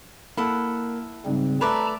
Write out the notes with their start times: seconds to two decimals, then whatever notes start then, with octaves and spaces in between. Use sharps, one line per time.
0.37 A#3 E4 A4 F#5
1.26 G#2 C#3 G3 C4
1.61 A3 B4 D5 E5 A5 A#5